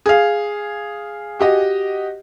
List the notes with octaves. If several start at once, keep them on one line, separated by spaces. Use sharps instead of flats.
G#4 F5
F#4 G4 D#5